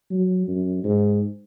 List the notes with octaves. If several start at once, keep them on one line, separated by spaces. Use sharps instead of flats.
F#3
F#2
G#2